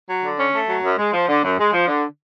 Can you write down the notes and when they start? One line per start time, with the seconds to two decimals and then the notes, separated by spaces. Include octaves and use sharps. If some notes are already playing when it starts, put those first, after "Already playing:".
0.09 F#3
0.23 D3
0.38 C#4
0.54 A3
0.68 F#3
0.83 F#2
0.98 G#3
1.13 F3
1.29 D3
1.44 F#2
1.59 G#3
1.73 F3
1.88 D3